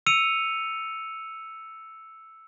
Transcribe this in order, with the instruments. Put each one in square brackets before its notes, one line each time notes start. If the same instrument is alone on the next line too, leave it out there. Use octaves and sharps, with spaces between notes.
[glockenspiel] E6 C#7 D#7 F7